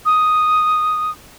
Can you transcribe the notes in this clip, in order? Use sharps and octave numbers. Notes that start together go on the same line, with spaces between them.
D#6